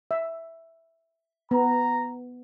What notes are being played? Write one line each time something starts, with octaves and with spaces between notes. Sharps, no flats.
E5
B3 A#5